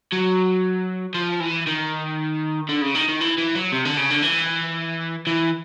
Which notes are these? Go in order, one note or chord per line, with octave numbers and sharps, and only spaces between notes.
F#3
F3
E3
D#3
D3
C#3
D#3
D#3
E3
E3
F#3
C3
D3
C#3
D3
E3
E3